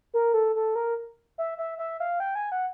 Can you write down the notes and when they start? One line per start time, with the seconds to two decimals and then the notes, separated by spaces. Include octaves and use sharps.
0.14 A#4
0.34 A4
0.56 A4
0.75 A#4
1.38 E5
1.58 E5
1.78 E5
2.00 F5
2.20 G5
2.35 G#5
2.52 F#5